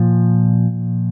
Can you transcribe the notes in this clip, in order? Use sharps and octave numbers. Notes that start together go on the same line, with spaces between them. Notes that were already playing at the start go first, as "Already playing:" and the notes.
Already playing: A#2 F3